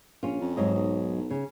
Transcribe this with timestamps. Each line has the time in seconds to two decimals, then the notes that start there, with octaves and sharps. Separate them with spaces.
0.23 A#1 C#4 F4
0.41 F2
0.57 G#2 F#3 D#5
0.74 B1
1.30 C#3